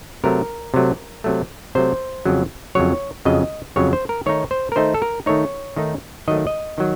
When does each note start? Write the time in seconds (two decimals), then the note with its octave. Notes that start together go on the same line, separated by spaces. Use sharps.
0.24 C3 F#3 A3 A#4
0.74 C3 F#3 A3
1.24 C3 F#3 A3
1.75 C3 F#3 A3 C5
2.25 F2 C#3 F#3
2.75 F2 C#3 F#3 C#5
3.25 F2 C#3 F#3 D#5
3.76 F2 C#3 F#3 C#5
3.93 C5
4.09 A#4
4.26 D#3 A3 D#4 C#5
4.51 C5
4.72 A#4
4.76 D#3 A3 D#4 C5
4.94 A4
5.02 A#4
5.26 D#3 A3 D#4 C#5
5.76 D#3 A3 D#4
6.28 D#3 F#3 A3 D#5
6.47 D#5
6.78 D#3 F#3